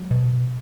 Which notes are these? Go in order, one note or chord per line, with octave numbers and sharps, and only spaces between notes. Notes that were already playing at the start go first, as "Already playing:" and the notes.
Already playing: F#3 G#3
B2